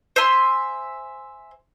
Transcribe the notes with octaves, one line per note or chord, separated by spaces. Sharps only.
C5 E5 G#5 C6